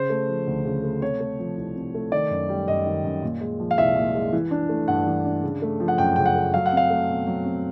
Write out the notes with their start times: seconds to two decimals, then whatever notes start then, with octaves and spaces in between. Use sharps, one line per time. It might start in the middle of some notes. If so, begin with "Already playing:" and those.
Already playing: C#3 C5
0.10 A3
0.29 F3
0.47 D2
0.65 C#3
0.84 A3
1.02 C3 C#5
1.20 A3
1.39 F3
1.57 C2
1.76 C3
1.95 A3
2.12 D#3 D5
2.31 F#2
2.49 G3
2.68 F#2 D#5
2.86 D#3
3.04 F#2
3.22 A#2
3.41 G#3
3.60 F3
3.71 F5
3.78 C2 E5
3.96 A#2
4.14 G#3
4.33 E3
4.51 D4
4.69 A3
4.88 G2 F#5
5.06 E3
5.25 D4
5.43 C#3
5.62 A3
5.80 F3
5.88 F#5
5.98 F#2 G5
6.16 C#3 G5
6.26 F#5
6.35 A3
6.54 F#3 F5
6.66 F#5
6.72 C4
6.77 F5
6.90 A3
7.09 B2
7.27 F#3
7.45 C4